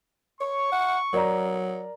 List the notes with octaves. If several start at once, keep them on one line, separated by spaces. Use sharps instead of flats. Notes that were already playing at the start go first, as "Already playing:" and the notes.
C#5 C#6
F#5
F#3 A#4 D5 A#5